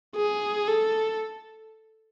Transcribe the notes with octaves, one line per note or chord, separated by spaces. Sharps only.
G#4
A4